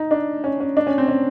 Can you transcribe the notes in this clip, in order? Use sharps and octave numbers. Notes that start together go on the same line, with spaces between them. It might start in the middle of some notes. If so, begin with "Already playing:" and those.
Already playing: D#4
D4
C#4
C#4
D4
C#4
C4
C#4